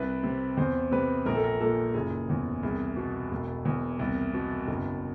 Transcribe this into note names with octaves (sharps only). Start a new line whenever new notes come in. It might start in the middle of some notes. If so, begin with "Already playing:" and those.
Already playing: C2 B4
C3
E2 C5
C3 B4
A#1 A#4
A4
A#4
A#2 A4
F#1 G#4
E2
C2 G#4
B2
E1
E2
C2
B2
F#1